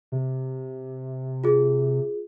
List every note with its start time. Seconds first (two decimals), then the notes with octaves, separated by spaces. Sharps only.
0.12 C3
1.44 F4 G#4